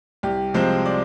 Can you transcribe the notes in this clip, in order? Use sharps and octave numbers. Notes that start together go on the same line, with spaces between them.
C2 G4
C3 F3 G#3 C4 C5
D5